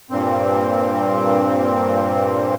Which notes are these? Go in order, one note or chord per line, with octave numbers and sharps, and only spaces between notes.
G2 A#2 C4